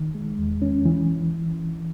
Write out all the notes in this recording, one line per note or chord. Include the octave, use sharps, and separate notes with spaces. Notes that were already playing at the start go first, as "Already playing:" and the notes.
Already playing: D#3
G#3
E2
C#4
E3